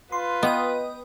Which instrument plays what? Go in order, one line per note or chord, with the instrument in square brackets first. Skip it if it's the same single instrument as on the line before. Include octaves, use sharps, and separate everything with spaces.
[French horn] F4 [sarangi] B4 [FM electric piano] C6
[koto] B3 [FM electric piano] D#5 G5 D#6